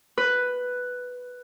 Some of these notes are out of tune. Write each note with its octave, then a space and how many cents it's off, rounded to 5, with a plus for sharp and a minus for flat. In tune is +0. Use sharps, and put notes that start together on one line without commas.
B4 +5